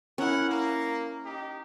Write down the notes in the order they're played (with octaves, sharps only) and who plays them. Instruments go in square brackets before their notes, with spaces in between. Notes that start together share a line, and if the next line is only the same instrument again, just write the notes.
[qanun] C#4 E4 [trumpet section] A#4 F#5
[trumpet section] A#3
D#4 G4